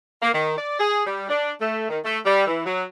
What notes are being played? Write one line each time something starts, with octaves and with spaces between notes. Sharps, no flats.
A#3
D#3
D5
G#4
G3
D4
A3
D#3
A3
G3
E3
F#3